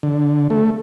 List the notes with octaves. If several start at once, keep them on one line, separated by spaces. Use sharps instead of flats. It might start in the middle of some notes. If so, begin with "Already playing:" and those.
D3
A3